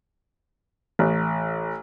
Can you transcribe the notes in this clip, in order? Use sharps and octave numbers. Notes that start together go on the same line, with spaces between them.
A1